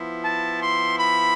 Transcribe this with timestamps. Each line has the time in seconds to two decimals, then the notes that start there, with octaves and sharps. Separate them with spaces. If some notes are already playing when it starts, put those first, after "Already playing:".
Already playing: F3 B3 E4
0.25 A5
0.62 C6
0.99 B5